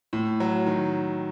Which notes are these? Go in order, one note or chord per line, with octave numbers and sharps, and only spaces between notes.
A2
F#3
D#3